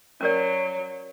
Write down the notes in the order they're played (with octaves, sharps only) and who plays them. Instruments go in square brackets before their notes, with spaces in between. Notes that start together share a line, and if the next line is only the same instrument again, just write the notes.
[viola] F#3 [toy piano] C#4 A#4 D5